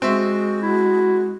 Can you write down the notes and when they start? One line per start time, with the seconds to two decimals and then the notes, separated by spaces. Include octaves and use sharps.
0.02 G#3 C4 F#4 E5
0.62 E4 F#4